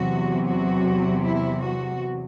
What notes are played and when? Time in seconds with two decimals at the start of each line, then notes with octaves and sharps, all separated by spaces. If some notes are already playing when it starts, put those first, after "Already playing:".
Already playing: E2 C3 F#3 F#4
0.47 F#4
1.25 E4
1.63 F#4